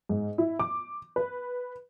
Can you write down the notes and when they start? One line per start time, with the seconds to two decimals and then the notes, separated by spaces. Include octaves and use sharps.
0.09 G#2
0.38 E4
0.60 D6
1.16 B4